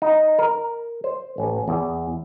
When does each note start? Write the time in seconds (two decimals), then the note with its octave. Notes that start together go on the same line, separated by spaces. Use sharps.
0.02 D#4
0.39 A#4
1.04 C5
1.38 A1
1.68 E2